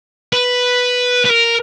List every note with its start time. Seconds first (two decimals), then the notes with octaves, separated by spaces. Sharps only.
0.33 B4
1.25 B4
1.30 A#4